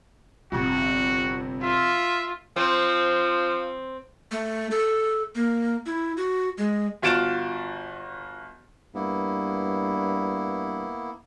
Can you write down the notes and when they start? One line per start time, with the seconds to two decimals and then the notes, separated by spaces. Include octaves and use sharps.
0.52 G1 F2 C3 F#4
1.62 F4 E5
2.56 F3 C4
4.31 A3
4.71 A4
5.35 A#3
5.86 E4
6.17 F#4
6.58 G#3
7.02 G1 F4 F#4 A6 D7 E7
8.95 G2 A#3 B3 E4